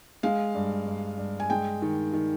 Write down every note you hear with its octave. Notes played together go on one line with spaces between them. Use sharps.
G#3 F5
G2
G2
G2
G#5
G#3 G5
D#3
D#3